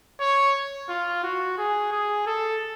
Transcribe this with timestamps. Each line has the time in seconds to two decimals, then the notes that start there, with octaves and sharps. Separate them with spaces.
0.20 C#5
0.89 F4
1.24 F#4
1.58 G#4
1.92 G#4
2.27 A4